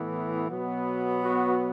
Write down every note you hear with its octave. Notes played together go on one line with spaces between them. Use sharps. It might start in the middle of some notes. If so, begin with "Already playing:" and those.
Already playing: A2 E3 B3
B2 F#3 B3
F#4